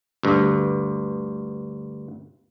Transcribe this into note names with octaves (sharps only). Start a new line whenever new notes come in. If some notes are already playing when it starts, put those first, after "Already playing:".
D2 G2